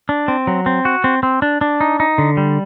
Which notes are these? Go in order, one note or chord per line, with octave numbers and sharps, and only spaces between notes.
D4
C4
F#3
C4
F#4
C4
C4
D4
D4
D#4
D#4
D3
G3